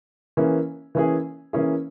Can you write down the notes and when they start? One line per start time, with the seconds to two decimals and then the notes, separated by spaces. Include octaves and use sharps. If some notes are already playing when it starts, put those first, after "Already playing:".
0.37 E3 A#3 C#4 E4 G#4
0.95 E3 A#3 C#4 E4 G#4
1.53 E3 A#3 C#4 E4 G#4